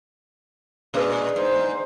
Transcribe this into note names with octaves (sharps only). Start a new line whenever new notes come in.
A#2 G#3 D4 G#4 B4
G#2 C5